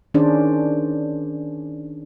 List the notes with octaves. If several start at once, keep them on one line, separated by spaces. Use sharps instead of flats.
D#3 C#4 D4 G#4 C5 D5